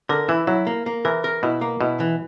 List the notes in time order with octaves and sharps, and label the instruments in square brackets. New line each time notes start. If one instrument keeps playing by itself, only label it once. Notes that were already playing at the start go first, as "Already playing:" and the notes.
[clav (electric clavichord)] D3 [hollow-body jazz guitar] A#4
[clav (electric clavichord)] E3 [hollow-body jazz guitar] E4
[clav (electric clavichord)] F#3 [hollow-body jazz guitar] E4
[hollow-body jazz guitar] A#3
A#3
[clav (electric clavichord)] E3 [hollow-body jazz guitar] A#4
[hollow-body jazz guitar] A#4
[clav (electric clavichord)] B2 [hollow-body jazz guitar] E4
[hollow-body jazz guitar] A#3
[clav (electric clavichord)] B2 [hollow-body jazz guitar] E4
[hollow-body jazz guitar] E3